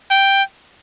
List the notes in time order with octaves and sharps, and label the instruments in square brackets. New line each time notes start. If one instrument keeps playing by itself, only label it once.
[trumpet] G5